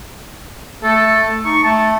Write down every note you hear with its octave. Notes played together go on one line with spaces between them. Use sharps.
A3 A4
D#4 C#6
A3 A5